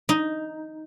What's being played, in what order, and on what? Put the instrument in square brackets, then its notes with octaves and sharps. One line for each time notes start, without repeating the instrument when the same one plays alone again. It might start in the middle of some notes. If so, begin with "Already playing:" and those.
[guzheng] D#4